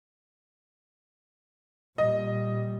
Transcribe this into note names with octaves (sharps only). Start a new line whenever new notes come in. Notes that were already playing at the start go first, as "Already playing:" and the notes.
A#2 G3 D#5